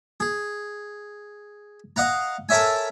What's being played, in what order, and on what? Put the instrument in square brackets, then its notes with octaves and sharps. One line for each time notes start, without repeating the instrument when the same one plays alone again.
[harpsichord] G#4
D#5 F5 F#5 A#5
A4 A#4 C#5 E5 G#5